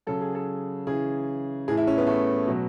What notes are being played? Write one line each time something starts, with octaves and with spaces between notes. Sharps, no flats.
C#3 F#3 A4
G#4
A4
C#3 E3 G#4
A2 E3 G#4
E4
C#4
B3
A3
B2 F#3